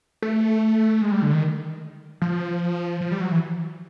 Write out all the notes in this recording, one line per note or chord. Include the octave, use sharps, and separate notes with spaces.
A3
G#3
G3
D3
D#3
F3
F3
G3
F#3
E3